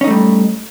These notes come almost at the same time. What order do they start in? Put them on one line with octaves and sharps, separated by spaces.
C#4 D#4 A3 G3